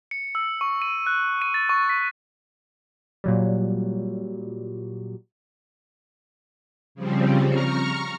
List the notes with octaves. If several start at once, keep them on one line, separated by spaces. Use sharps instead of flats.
C#7
E6
C#6
D#7
F#6
D#7
A6
C#6
B6
A#2 F#3 G3
C#3 F3 G3 C4
A#5 C#6 F6